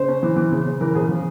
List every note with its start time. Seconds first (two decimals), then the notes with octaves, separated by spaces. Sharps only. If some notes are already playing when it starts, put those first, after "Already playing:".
Already playing: C#3 C5
0.08 C#4
0.23 E3
0.36 E3
0.52 C#3
0.67 C#3
0.80 E3 A#4
0.95 C#3 G#4
1.09 F3